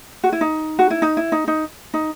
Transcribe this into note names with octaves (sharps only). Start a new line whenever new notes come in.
F#4
E4
D#4
F#4
E4
D#4
E4
D#4
D#4
D#4